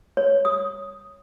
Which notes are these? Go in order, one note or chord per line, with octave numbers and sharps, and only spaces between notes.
C#5
D#6